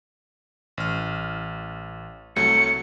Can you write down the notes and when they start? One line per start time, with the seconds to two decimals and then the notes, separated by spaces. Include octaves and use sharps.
0.77 A1 F6
2.36 C2 F#3 A3 C#7